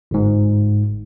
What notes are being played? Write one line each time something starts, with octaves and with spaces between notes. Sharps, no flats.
G1 G#2